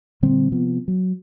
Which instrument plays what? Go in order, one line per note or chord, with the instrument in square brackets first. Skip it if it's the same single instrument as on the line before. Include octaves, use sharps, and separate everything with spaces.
[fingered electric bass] A#2 D3 G3 C4
C3 F3 B3
F#3